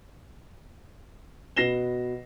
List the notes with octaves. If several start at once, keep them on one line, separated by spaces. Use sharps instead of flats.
B2 B4 A#6 C7 E7 G7